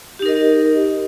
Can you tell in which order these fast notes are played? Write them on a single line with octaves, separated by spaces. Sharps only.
G4 D#4 A#4 D#5